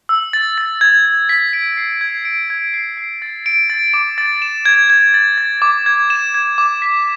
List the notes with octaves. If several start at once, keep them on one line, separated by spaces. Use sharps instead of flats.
E6
A6
A6
G#6
G#6
B6
D7
C7
G#6
D7
G#6
C7
C7
A6
D7
A6
D6
A6
E7
G#6
G#6
A6
A6
D6
G#6
E7
G#6
D6
B6